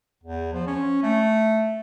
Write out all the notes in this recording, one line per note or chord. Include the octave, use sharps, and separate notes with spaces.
E2
F3
C#4
A3